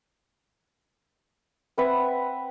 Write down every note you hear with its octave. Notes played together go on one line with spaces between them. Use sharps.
C4 B4 E5 F#5